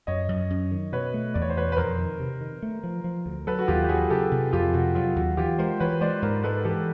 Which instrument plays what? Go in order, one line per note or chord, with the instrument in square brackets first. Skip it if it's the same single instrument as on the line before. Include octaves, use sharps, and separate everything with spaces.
[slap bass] F#2 [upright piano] C#5 D#5
[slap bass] F#2
F#2
D#3
[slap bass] B2 [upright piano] B4 C#5
[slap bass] A3
[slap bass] E2 [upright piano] D5
[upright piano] C#5
C5
[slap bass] B2 [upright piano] B4 C#5
[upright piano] B4
[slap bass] F2 [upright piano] A#4 C5
[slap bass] D#3
C3
D#3
A3
F3
F3
D2
[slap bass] F#3 [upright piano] A4 B4
[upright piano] F#4
[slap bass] D#2 [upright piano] F4 G4
[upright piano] G4
[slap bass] F#3 [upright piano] F#4 G#4
[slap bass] C#3 [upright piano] G4 A4
[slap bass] C3
[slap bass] F2 [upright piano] F4 G4
[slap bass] C3 [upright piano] F#4
[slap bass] F#3 [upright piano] F4
[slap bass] D#2 [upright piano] F#4
[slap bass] E3 [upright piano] F4 G4
[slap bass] G#3 [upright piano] A#4 C5
[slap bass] E3 [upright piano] B4 C#5
[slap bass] G#3 [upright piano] C5 D5
[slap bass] G#2 [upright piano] A#4 C5
[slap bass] G#3 [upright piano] A4 B4
[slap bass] E3 [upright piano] G4 A4